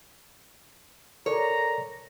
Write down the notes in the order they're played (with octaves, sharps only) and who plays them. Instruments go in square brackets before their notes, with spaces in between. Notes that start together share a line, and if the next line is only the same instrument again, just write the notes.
[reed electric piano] A4 A#4 D5 [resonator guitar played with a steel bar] C#5 [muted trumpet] A#5